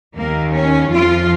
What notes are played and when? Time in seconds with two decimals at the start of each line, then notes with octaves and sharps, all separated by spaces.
0.15 D#2 D#3 A#3
0.54 C#4
0.91 F2 F3 F4